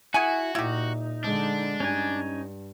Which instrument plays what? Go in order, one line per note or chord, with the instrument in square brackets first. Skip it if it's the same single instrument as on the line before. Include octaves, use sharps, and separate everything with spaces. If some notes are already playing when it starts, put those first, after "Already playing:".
[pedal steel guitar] E4 [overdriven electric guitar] F#4 [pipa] G#4 F#5 G#5
[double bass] A#2 [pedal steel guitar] D#4 [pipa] E4 G4
[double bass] D3 G#3 [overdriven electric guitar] D4
[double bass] G2 [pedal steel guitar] C#4 D#4 G#5